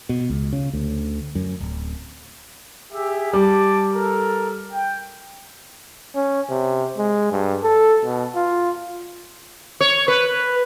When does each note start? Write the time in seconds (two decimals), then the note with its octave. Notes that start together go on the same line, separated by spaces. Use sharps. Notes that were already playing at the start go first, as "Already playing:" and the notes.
0.09 B2
0.29 C#2
0.53 C#3
0.73 D2
1.35 F#2
1.60 D1
2.93 G4 G#4 E5
3.33 G3 A5 D6
3.94 A4 A#4
4.72 G5
6.15 C#4
6.49 C3
6.98 G#3
7.32 G2
7.64 A4
8.04 B2
8.35 F4
9.80 C#5
10.08 B4